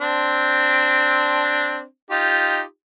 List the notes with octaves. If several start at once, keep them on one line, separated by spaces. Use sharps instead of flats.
C4 D4
D#4 F4 G4